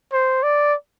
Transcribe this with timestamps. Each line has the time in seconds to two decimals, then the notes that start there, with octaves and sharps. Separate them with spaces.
0.13 C5
0.43 D5